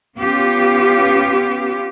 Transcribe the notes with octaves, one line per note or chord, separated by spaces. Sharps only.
B3 C#4 F4 G4